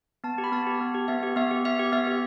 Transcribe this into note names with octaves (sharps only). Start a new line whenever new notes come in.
B3 A5
G4
B5
B3 A5
G4
B3
G4
B3 E5
G4
B3 E5
G4
B3 E5
G4
B3 E5
G4